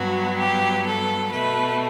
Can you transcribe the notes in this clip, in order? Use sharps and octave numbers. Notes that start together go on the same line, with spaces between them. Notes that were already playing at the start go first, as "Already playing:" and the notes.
Already playing: G2 F#3 B3 F#4
G4
A4
B2 A3 B4